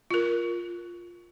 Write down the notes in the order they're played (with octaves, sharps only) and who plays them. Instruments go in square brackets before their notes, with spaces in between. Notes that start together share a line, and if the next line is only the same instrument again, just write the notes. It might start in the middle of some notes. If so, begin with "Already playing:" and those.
[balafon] F4 A#4